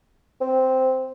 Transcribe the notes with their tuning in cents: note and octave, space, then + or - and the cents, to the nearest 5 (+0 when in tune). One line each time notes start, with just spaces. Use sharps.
C4 -5